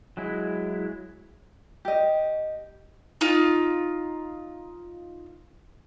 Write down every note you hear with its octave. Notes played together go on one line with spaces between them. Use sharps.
F#3 G#3 E4
G4 D#5
D#4 F4